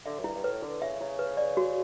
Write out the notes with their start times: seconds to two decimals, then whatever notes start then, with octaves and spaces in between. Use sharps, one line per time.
0.06 D3 E5
0.19 F#2
0.24 G2 E4
0.35 G2
0.44 A2 B4
0.62 D3 E4
0.82 C#3 E5
1.00 C#3 E4
1.19 B4
1.37 D5
1.57 F#4